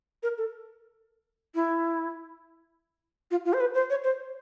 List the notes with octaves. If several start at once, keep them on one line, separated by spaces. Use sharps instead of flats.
A#4
A4
E4
F4
F4
C5
B4
C5
C#5
C5